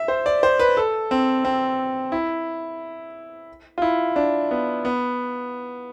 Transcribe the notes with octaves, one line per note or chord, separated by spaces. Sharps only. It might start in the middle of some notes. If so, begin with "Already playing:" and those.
Already playing: E5
C5
D5
C5
B4
A4
C4
C4
E4
F4
E4
D4
B3
B3